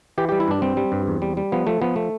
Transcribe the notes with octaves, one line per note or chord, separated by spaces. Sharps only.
E3 G4
G3 G4
E4
G2 D4
G3 C4
G3
G2
E2
G3
G3
F3 B3
F3 A3
F3 B3
A3